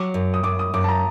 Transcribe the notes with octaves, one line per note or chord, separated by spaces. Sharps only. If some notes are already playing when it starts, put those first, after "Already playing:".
Already playing: F#3 D6
F#2
D#6
F#2 D6
D#6
F#2 D6
A5
A#5